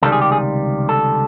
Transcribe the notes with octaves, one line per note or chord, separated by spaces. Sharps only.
C#2 C3 D#3 G3 A4
G#4
G4
G#4
A4